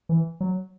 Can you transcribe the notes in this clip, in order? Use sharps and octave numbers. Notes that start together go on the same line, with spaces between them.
E3
F#3